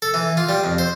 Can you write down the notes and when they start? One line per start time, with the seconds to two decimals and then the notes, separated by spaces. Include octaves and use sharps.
0.02 A4
0.14 E3
0.37 F4
0.49 G3
0.64 F2
0.78 C5